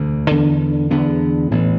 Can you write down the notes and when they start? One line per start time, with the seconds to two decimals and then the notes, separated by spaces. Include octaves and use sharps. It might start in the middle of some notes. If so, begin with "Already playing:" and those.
Already playing: E1 D2 D3
0.30 E2 D3 B3 D4
0.90 E2 D3 B3 D4
1.51 A1 A2 E3 B3